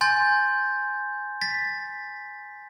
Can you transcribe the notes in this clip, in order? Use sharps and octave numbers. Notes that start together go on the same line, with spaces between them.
G#5 C6 G6 A6
A6 B6